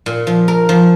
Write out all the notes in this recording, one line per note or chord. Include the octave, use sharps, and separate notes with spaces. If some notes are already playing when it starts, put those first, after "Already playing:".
A#2
F3
A#4
F3